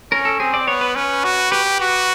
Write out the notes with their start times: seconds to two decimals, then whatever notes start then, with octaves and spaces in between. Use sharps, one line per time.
0.12 C#4 A#4
0.25 A4
0.40 C4 G#4
0.54 D5
0.67 B3 C#5
0.81 B4
0.96 C#4 B4
1.24 F#4
1.51 G4 B4
1.66 B4
1.80 F#4